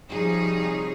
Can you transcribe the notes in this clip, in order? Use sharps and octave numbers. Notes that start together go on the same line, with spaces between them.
C3 F3 G3 D#4 G#4 C#5